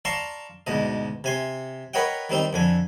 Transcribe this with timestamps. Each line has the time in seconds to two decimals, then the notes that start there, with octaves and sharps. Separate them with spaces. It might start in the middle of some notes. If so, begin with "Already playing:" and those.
0.05 D5 F5 A5 A#5 C6 C#6
0.67 D2 G#2 B2 D#5
1.24 C3 G#5 C6
1.94 A#4 B4 C#5 D#5 F#5 G5
2.29 D#3 G3 C4 D#4
2.53 F2 D3 G#5